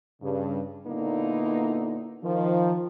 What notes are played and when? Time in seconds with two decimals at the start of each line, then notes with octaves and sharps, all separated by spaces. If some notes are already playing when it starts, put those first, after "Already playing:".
0.22 G2 C#3
0.87 A#2 D3 A#3 B3 D#4 E4
2.24 D#3 F3